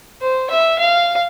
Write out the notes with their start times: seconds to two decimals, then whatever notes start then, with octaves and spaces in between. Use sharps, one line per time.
0.21 C5
0.50 E5
0.79 F5